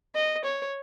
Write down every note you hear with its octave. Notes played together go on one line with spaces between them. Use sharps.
D#5
C#5